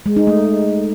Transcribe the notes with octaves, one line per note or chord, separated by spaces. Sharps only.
G#3
D#4
A3